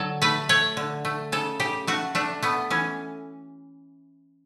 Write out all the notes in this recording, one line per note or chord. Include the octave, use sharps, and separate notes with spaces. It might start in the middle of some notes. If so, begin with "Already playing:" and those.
Already playing: D3 F#3 A4
A3 B4
A3 C#5
D3
A3
C#3 A4
C#3 G4
A3 F#4
A3 D4
A3 B3
E3 C#4